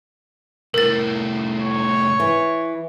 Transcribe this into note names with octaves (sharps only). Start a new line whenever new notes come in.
C2 A2 A#4 A6
C#5
E3